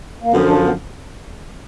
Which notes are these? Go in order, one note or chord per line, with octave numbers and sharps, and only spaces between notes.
A#3
F#2 D3 F3 B3
D4
B3